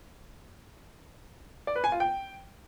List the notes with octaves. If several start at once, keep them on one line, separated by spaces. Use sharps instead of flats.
D5
B4
G#5
F4
G5